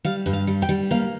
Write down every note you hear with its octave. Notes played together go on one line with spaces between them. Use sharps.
G3 F5
G2
F5
G3
G5
G3
A#3 F5